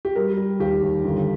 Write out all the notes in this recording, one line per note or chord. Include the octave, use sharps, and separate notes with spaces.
G4
G3 A#4
G3
D#2 G4
D#2
G1